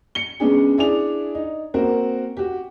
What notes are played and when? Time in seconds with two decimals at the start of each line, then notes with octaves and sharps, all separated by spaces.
0.15 C#7 G7
0.40 G#3 B3 C#4 D4 G#4
0.78 D4 E4 G#4 D5 F7
1.35 D#4
1.74 A#3 C4 F#4 A#4
2.37 F#4 G4